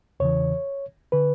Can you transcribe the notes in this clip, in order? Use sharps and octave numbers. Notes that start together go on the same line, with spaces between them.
E2 C#3 E3 C#5
D3 B4